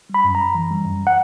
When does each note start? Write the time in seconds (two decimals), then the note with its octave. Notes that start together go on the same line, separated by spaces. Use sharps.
0.09 G3 B5
0.24 F#2
0.35 F#2 A#5
0.55 E3
0.70 G3
0.85 F#2
1.07 F#5